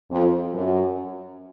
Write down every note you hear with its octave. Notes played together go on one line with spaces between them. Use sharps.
F2
F#2